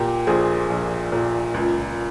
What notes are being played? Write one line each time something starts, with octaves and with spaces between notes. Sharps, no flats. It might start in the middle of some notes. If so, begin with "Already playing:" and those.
Already playing: A#2 G4 A#4
A#1 G#4 C5
A#1
A#2
C#2